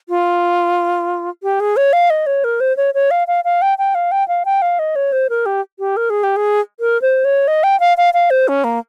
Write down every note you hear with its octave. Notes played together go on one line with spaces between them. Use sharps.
F4
G4
G#4
C#5
F5
D#5
C#5
A#4
C5
C#5
C#5
F5
F5
F5
G5
G5
F5
G5
F5
G5
F5
D#5
C#5
C5
A#4
G4
G4
A#4
G#4
G4
G#4
A#4
C5
C#5
D#5
G5
F5
F5
F5
C5
C#4
A#3